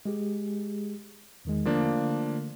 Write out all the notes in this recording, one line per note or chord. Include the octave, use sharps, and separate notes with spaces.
G#3 G4 G#4
E2 D#3 G#3
D3 F3 A3 A#3 D4